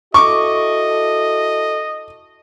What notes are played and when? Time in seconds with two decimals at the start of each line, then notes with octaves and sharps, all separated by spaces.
0.14 E4 F#4 A4 D#5 C#6 D6